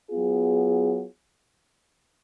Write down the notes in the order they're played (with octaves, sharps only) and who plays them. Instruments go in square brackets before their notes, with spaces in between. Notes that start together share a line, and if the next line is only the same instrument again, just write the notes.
[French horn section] F#3 B3 F4 G#4